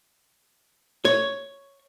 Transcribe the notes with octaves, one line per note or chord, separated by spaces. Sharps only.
C#5